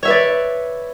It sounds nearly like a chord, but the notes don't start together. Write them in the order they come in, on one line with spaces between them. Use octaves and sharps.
C#5 E5 B4 D5